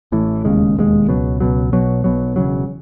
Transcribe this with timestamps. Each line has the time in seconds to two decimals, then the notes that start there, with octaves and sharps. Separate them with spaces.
0.12 A1 A2 E3
0.45 E1 D#2 C#3 G#3
0.77 E1 D#2 C#3 G#3
1.08 C#2 B2 F#3
1.40 C#2 B2 F#3
1.72 B1 B2 F#3
2.04 B1 B2 F#3
2.36 E1 E2 C#3 F#3